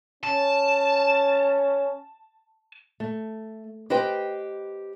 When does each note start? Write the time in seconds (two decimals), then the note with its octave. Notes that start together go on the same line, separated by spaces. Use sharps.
0.23 C#4 A5
3.00 A3
3.90 G4 B4 C5 D#5 G5